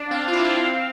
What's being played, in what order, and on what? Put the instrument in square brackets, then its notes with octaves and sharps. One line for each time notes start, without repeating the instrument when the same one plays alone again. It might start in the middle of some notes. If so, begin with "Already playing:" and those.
Already playing: [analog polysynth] D4
[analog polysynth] C4 [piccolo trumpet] F5
[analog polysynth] C4
F4
E4
C4
D4
C4